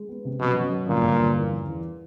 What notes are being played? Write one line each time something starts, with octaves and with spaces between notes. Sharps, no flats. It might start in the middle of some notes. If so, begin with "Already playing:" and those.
Already playing: G#3
B3
C3
F#2 B2
F#2
F#2
G1 A#2
G1
G1
E2
E3
E2